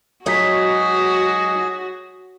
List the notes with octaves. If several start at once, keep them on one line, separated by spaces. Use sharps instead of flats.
F#3 G#3 D#4 F#4 G#4 C#5 B6